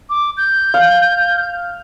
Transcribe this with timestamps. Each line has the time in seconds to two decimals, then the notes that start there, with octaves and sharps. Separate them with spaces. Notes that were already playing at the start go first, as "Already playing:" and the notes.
0.10 D6
0.37 G6
0.74 F5